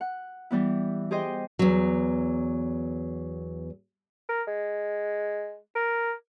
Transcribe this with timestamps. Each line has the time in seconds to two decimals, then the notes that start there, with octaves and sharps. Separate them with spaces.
0.01 F#5
0.51 E3 G3 B3 E4
1.11 G4 G#4 C5 D#5 G5
1.59 E2 F#3
4.29 A#4
4.48 G#3
5.75 A#4